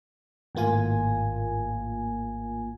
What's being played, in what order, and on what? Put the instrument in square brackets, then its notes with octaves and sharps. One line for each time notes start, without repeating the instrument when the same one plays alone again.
[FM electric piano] G#1 A2 A#3 F4 G#5